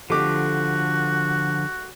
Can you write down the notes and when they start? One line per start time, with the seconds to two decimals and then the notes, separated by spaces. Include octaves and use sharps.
0.10 D3 F3 A3 F#4 G4 D6